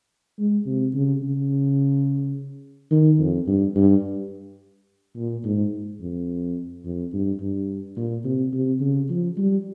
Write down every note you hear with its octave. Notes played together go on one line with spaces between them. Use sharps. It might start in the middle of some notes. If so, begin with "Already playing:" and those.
G#3
C3
C#3
C#3
D#3
F2
G2
G2
A#2
G#2
F2
F2
G2
G2
A#2
C3
C3
C#3
F3
G3